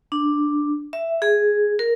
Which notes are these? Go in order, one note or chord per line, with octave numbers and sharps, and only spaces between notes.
D4
E5
G#4
A#4